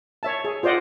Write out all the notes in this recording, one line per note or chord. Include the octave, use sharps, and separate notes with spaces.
C#5 E5 A5
G#4
F4 C5 D5 D#5 F#5